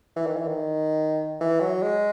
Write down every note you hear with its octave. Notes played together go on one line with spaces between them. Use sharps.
E3
D#3
E3
D#3
E3
F#3
G#3